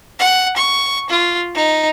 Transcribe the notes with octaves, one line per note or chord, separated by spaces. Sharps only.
F#5
C#6
F4
D#4